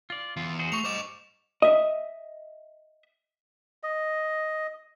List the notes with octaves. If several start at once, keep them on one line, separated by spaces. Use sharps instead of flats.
F4 D5
E2 F4
F#4 G#4 C5
A3 C#6 F7
G3 C5 D#5 C#6 D6 E7
D#5 E5
D#5